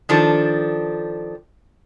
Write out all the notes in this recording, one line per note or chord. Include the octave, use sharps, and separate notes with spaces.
D#3 F3 D4 A4